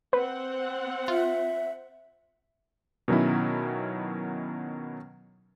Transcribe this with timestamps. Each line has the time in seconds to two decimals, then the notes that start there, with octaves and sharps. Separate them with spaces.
0.13 C4 B4 F#5
1.08 F4 E5
3.08 B2 D#3 F#3 C#4 E4